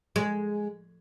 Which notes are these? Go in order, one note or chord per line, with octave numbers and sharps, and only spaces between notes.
G#3